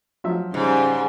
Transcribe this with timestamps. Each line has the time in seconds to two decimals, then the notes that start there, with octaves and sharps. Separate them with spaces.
0.24 F3 F#3 E5
0.54 G#2 C#3 G3 C6